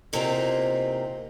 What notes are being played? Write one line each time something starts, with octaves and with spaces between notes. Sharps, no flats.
E2 C3 A#3 C4 D#4 F4